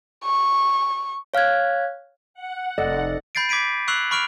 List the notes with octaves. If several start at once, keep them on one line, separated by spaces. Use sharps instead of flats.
C#6
C#5 F5 F6 F#6 G#6
F#5
F1 A4 D5 D#5
B5 G6 A6 C7 D7
D6 G#6 B6 D7 D#7
C#6 E6 F#6 C7 F7 F#7
B5 C#6 F6 D7 F7